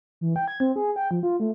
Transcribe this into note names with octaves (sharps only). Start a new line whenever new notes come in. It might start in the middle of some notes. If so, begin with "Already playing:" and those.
E3
G5
G#6
C4
G#4
G5
F3
F4
A3